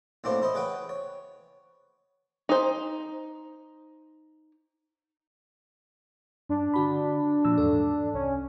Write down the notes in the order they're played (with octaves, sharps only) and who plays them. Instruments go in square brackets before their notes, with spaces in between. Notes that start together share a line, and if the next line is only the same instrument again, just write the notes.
[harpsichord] B1 A2 A#3 C4 D4 C5
E4 C5 D#5
G#4 B4 C#5 F#5 G5
C#5
[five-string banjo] D#4 C5
[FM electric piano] G2 [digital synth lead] D4
[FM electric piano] D3 F#4 B5
A#2 F3 E6
E2 G#2 A4
[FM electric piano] C2 [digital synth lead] C#4